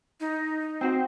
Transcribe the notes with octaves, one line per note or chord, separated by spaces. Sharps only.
D#4
C4 F#4 C5 G5